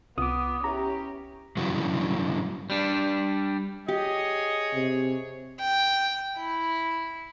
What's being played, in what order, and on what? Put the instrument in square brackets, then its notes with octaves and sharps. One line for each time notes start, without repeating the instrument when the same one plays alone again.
[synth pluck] C2 F4 [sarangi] B3 [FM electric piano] D6 D#6
[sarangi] C#4 [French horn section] E4 G4 [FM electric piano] A#5
[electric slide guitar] G2 C#3 E3 F#3
[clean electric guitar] G3 D4
[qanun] G4 [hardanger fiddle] G#4 C#5 [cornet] D#5
[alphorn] C3
[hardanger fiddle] G5
E4